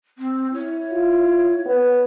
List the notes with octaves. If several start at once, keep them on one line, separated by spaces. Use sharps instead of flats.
C4
E4 C#5
F4
B3